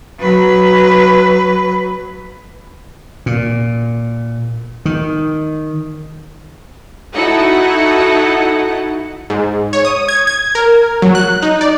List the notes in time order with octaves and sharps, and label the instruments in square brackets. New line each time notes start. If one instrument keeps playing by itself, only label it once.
[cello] F#3 B4
[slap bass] A#2
D#3
[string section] D#4 E4 F#4 A4 F#5
[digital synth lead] G#2
C#5
D#6
G#6
G#6
A#4
F#3
F#6
D#4
D5